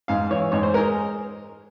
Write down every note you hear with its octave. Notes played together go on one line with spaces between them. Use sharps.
G#2 F5
E3 C#5
G#2 C#5
C5
G#3 A#4